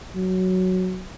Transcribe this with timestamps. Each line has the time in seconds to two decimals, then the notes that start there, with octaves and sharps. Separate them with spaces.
0.16 F#3